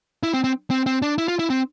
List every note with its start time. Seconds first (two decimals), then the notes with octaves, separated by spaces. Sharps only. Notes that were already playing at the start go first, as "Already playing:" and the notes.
0.23 E4
0.33 C4
0.44 C4
0.70 C4
0.86 C4
1.02 D4
1.18 E4
1.28 F4
1.39 E4
1.50 C4